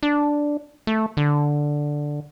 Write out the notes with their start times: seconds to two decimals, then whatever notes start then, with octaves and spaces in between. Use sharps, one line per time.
0.03 D4
0.87 A3
1.17 D3